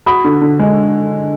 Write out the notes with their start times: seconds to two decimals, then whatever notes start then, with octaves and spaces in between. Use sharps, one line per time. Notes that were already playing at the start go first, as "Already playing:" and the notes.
0.06 F#4 B5 D#6
0.24 D3
0.41 D3
0.59 G#3